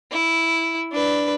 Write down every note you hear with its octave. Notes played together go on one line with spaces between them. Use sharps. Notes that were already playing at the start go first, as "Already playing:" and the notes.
E4
D4 B4